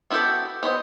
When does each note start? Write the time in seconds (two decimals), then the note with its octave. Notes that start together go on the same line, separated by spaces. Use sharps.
0.10 B3 E4 F#4 G4 A4
0.63 B3 C5 C#5 D#5